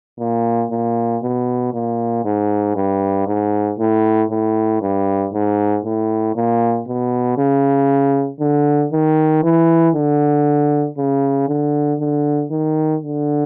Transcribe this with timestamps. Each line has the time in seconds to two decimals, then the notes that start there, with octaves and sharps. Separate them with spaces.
0.20 A#2
0.71 A#2
1.23 B2
1.74 A#2
2.25 G#2
2.76 G2
3.27 G#2
3.79 A2
4.31 A2
4.82 G2
5.33 G#2
5.85 A2
6.36 A#2
6.87 B2
7.38 C#3
8.40 D3
8.92 D#3
9.43 E3
9.95 D3
10.98 C#3
11.48 D3
11.99 D3
12.51 D#3
13.02 D3